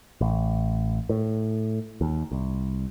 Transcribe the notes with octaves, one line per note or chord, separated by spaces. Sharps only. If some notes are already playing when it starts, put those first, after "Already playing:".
A1
A2
D#2
C2